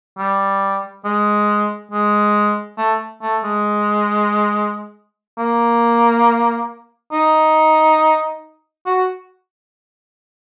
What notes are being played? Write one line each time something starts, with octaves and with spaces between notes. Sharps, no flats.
G3
G#3
G#3
A3
A3
G#3
A#3
D#4
F#4